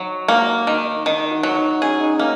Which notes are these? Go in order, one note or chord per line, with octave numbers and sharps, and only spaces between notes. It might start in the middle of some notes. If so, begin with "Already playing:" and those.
Already playing: F#3 D#4 F#4
A#3
D#3
D#3 D#4
F#4
F#3 F#4
D#4
C#4 G#4
D#4
C#4
A#3 D#4